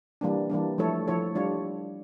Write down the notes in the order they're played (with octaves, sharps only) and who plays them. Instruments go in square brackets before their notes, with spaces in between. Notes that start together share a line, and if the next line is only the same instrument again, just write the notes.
[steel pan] E3 G3 A#3 D4
E3 G3 A#3 D4
F3 A3 E4 A4 C#5
F3 A3 E4 A4 C#5
G3 D4 F4 C#5